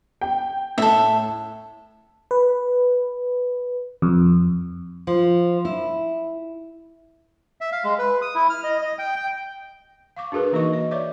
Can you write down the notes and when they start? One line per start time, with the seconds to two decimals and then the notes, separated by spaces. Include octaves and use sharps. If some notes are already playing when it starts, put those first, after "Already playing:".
0.21 G5
0.78 A2 A4 E5
2.31 B4
4.02 F2
5.07 F3
5.65 E4
7.61 E5
7.72 F5
7.84 G#3
7.99 B4
8.22 D#6
8.35 E4
8.50 F6
8.64 D#5
8.81 D#5
8.99 G5
9.16 G5
10.16 F5 C#6 D6
10.32 D4 F#4 G#4 A#4 B4
10.52 E3 A#3 D#4 F#4 D#5 C#6
10.73 D#5
10.91 C#5 D5 E5 D6